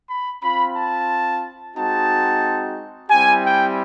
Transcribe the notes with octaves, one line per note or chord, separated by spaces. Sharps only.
B5
C4 F4 B5
A5
G#3 C4 D#4 F#4 A5
G3 C4 E4 G4 G#5
G5